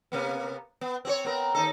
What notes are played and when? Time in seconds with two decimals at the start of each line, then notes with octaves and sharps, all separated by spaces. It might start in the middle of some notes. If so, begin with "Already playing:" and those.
0.12 C3 A#3 B3
0.81 B3
1.05 C4 G4 C#5
1.25 B3 C4 A#4
1.55 D#2 D#4 A4